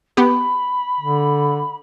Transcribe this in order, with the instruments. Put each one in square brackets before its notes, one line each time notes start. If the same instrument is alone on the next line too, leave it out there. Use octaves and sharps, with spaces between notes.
[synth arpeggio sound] B3 G4 [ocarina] B5
[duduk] D3